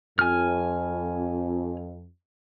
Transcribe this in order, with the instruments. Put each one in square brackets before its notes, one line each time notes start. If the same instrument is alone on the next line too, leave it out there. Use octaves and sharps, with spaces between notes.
[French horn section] F2 [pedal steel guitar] G#5 F6